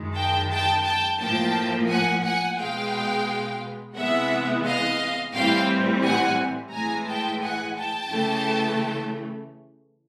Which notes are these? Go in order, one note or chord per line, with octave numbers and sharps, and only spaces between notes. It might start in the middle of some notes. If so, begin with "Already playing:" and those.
Already playing: F#2 D#3 G#3
G5 A5
G5 A5
G5 A5
A2 F3 A#3 G5 A5
F#5 G#5
F#5 G#5
B2 G#3 B3 F5 G5
C3 E3 G#3 B3 E5 F#5
D#5 F5
A2 E3 G3 C4 F5 G5
F#5 G#5
A2 E3 G#3 G#5 A#5
G5 A5
F#5 G#5
G5 A5
C#3 E3 A3